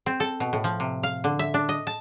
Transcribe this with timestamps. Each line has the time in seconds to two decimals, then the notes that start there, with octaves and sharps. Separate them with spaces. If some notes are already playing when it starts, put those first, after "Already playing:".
0.06 C4
0.20 A4
0.40 B2
0.53 A2
0.64 F3
0.80 C3
1.03 F5
1.24 D3
1.39 E5
1.54 D4
1.69 D#5
1.87 A5